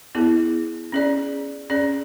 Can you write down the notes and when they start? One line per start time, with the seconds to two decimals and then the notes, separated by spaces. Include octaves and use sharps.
0.15 B3 E4 G#4
0.92 C#4 G#4 D5
1.70 C#4 G#4 D5